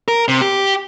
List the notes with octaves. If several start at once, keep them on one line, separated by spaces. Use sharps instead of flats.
A#4
C3
G4